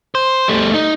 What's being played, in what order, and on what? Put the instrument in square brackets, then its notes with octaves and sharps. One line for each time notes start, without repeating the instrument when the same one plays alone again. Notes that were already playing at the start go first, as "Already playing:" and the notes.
[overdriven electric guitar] C5
G3 A3
D#4